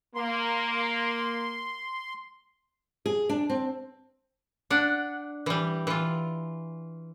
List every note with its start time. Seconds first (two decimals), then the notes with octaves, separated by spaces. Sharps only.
0.15 A#3 C6
3.06 G#4
3.29 D4
3.50 C4
4.70 D4 F#5
5.46 E3 G3
5.87 E3 F4